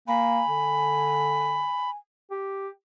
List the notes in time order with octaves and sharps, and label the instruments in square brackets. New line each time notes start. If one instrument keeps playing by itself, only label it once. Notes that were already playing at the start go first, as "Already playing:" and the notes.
[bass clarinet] A#3 [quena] G#5 [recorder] B5
[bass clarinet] D3
G4